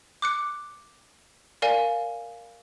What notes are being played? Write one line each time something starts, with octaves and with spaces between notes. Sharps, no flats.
D6 F#6 C#7
A#4 D5 F5 G#5